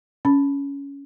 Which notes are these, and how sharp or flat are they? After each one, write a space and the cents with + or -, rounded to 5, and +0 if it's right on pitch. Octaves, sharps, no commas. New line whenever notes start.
C#4 +15 B5 +0